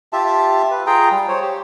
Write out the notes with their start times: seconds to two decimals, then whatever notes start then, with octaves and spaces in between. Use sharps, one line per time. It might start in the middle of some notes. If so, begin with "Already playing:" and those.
0.13 F4 G4 E5 A5
0.71 B4
0.87 F4 G#4 G5 A#5
1.11 G3
1.28 C5 C#5
1.42 G4